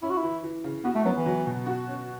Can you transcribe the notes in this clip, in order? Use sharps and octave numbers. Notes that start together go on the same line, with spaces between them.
C#4 E4
F#4
E4
E3
E3
C#3
B3 F#4
A3
F#3 B3
E3
F#3
B2
F#4
C#4